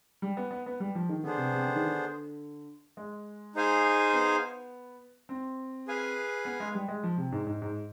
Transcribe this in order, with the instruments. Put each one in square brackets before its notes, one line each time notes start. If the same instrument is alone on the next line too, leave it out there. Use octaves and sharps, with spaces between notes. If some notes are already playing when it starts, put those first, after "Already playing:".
[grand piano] G3
B3
B3
B3
G3
F3
D#3
[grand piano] D3 [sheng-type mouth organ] B3 D4 G#4 C5
[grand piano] C3
C3
D3
D#3
D3
G#3
[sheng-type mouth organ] D#4 G#4 C5 F5 G#5
[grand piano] B3
C4
[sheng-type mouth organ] G#4 B4 F5 G#5
[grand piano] B3
G#3
G3
G#3
F3
C3
G#2
G#2
G#2